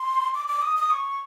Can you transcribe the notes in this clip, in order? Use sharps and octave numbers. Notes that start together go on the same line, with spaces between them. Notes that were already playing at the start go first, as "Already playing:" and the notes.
Already playing: C6
D6
D6
D#6
D#6
C#6